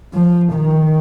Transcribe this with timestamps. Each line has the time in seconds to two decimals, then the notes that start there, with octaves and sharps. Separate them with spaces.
0.14 F3
0.54 D#3